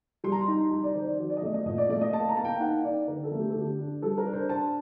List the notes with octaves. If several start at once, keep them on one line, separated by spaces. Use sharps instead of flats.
G3 C6
A#5
C6
D#4
G3 A#5
D5
D#3 C5
D5
F#3 D5
D5
D#5
A3 D5
D#5
A#2 D#5
D5
A3 D5
D#5
A#3 A5
A#5
A#3 A5
G5
D#4 F#5
D#4 D5
D3 A#4
A4
A3
G4
D3 A4
G4
D4
G3 A4
A#4
D4
C5
D4 A5